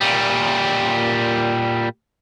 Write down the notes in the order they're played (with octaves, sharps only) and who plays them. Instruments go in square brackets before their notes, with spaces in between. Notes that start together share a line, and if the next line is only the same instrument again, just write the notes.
[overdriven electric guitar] A#2 G3